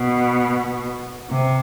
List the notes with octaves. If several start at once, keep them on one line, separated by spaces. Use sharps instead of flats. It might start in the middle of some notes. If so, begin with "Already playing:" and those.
Already playing: B2
C3